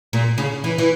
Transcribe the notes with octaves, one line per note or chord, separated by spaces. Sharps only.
A#2
C#3
E3
E3